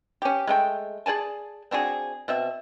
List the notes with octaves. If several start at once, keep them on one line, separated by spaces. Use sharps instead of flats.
C#4 G4
G#3 A3 G5
G#4 D5 G#5 A5
C4 D4 F#4 G#4
B2 C4 E5